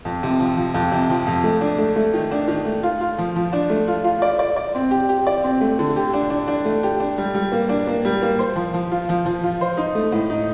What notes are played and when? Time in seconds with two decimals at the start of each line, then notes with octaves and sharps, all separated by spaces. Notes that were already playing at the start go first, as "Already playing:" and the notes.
0.05 F2
0.23 C3
0.40 F3
0.57 F3
0.74 F2
0.91 C3
1.10 F3
1.27 F2
1.44 A3
1.61 D4
1.78 A3
1.96 A3
2.14 D#3
2.31 D4
2.48 D#3
2.65 A3
2.83 F4
3.01 F4
3.18 F3
3.36 F3
3.53 D4
3.70 A3
3.88 F4
4.04 F4
4.22 D5
4.39 D5
4.56 D5
4.75 C4
4.91 G4
5.09 G4
5.27 D5
5.44 C4
5.61 A3
5.79 D3
5.96 G4
6.13 D4
6.30 D4
6.48 D4
6.65 A3
6.83 G4
7.00 D4
7.18 G3
7.35 G3
7.52 A#3
7.69 D4
7.87 A#3
8.05 G3
8.22 A#3
8.39 C5
8.56 F3
8.74 F3
8.91 F4
9.09 F3
9.26 F3
9.43 F4
9.61 C5
9.77 D#4
9.95 A3
10.12 A2
10.30 D#4